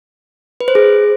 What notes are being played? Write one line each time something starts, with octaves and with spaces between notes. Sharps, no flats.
B4
C5
G#4